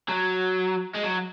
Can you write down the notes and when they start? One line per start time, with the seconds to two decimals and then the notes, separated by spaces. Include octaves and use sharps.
0.09 F#3
0.95 G#3
1.04 F#3